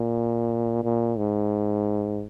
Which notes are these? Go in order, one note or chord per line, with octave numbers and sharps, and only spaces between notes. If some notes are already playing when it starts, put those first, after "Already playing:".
Already playing: A#2
A#2
G#2